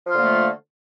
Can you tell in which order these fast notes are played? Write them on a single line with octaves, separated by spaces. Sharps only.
F3 F4 D3 A#3 A3